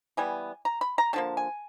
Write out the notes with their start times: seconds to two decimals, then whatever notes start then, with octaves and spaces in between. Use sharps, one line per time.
0.17 E3 G3 B3 G#5
0.65 A#5
0.81 B5
0.98 A#5
1.13 D3 F3 A#3 A5
1.37 G#5